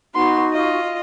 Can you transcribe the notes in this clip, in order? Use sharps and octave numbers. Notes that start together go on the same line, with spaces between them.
B3 D#4 F#4 C6
F4 D#5